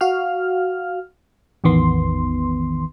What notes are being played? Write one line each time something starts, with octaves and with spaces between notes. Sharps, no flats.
F#4 F5 F6
A1 E2 D#3 B3 C6